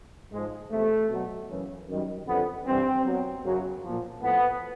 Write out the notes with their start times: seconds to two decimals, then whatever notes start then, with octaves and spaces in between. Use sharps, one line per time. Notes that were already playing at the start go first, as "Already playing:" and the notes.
0.32 G#2 F3 G#3
0.71 E2 C3 F3 A3
1.10 B2 F#3
1.50 F#2 C#3 E3
1.89 F#2 D#3 G3
2.27 F2 D3 G3 B3
2.66 G2 E3 G3 C4
3.05 B2 F#3
3.45 F#2 C#3 F#3
3.84 A#2 F3
4.23 A2 F3 B3